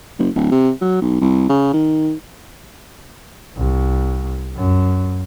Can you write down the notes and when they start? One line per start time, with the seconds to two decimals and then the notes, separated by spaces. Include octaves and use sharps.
0.19 F#1
0.35 D1
0.51 C3
0.81 F#3
1.01 B1
1.21 C2
1.49 C#3
1.73 D#3
3.57 C2
4.57 F#2